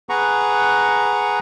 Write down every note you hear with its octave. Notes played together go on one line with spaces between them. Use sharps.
G#4 B4 F#5 A#5 C#6